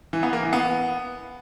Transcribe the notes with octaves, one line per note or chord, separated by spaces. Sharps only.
E3
B3
A#3
E3
B3